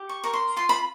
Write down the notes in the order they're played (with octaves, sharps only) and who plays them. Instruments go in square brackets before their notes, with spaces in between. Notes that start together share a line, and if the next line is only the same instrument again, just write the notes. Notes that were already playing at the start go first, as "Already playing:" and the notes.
Already playing: [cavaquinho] G4
C#6
A#4 C#6
C6
F4 C6
B5